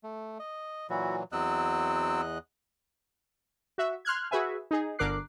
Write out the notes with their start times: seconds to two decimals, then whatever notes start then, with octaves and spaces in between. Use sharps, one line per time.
0.04 A3
0.40 D#5
0.90 A#2 E3 F#3 E4 F#4
1.32 E2 F#3 C4 D#5 E6 F#6
3.78 F#4 E5
4.05 C6 F6 F#6 G#6
4.31 F#4 G#4 B4 E5 G#5
4.71 D#4 G#4
4.99 G1 D3 A#4 D6 F#6 C7